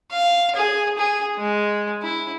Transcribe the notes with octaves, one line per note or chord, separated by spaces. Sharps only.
F5
G#4
G#4
G#3
E4